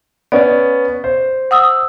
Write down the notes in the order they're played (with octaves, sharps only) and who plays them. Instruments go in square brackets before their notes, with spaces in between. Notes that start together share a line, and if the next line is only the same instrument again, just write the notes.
[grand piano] B3 C#4 [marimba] D5
[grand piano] C5
[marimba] F#5 D#6 E6